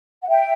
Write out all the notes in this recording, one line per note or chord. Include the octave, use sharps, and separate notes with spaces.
F#5
E5 G5